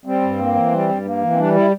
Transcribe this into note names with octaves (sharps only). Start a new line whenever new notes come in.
G3 C4
G2
A#3
E3
G3
G2
A#3
E3
C4
G3 D4
E4